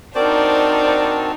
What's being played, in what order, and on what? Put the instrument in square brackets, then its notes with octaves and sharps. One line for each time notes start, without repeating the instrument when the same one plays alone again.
[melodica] C4 F#4 A5 [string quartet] D4 D#4 [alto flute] A#4 [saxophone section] C5 D5